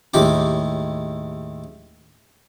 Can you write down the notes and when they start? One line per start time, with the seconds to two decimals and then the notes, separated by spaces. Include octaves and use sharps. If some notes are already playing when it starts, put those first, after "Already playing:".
0.14 D#2 A2 G#3 G4 D6